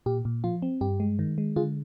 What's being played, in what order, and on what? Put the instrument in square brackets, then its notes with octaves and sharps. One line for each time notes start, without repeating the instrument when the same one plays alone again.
[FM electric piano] A#2 G4
A#2
F3 F4
C4
G2 G4
G#3
D#3
G#3
D3 F4 G#4